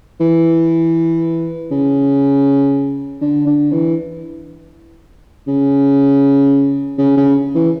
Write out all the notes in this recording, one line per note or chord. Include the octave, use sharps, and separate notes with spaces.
E3
C#3
D3
D3
E3
C#3
C#3
C#3
E3